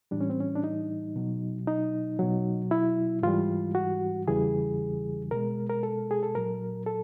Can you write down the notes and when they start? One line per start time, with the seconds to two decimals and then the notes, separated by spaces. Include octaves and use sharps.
0.11 A2 E3 G3 D4
0.21 C#4
0.30 C4
0.40 C#4
0.55 D4
0.64 D#4
1.16 B2 F#3
1.67 D#4
2.19 B2 F#3
2.71 E4
3.23 G#2 E3 G3 F4
3.75 F#4
4.28 E2 C#3 E3 G3 G#4
5.31 B2 G#3 A#4
5.70 A#4
5.83 A4
6.11 G#4
6.23 A4
6.35 A#2 F#3 A#4
6.86 A4